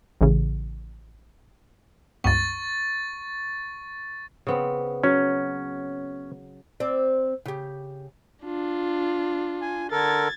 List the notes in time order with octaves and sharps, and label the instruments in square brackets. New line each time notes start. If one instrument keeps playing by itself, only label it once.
[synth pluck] A1 C#3
[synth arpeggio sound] C#2 G2 B3 [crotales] C#6 A6
[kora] C#3 B3 C4
[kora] F#3 [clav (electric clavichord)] C#4
[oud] C4 D5
C#3 G4
[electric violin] D4 F4
[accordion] G#5
[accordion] D3 A4 A#4 [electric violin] G#6 A6